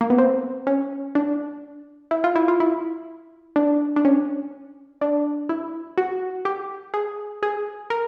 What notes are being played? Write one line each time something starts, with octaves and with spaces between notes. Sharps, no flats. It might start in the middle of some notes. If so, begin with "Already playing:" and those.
A#3
B3
C4
C#4
D4
E4
F4
E4
F4
E4
D4
D4
C#4
D4
E4
F#4
G4
G#4
G#4
A#4